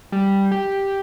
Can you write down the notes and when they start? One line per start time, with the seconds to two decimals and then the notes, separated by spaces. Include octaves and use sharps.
0.12 G3
0.51 G4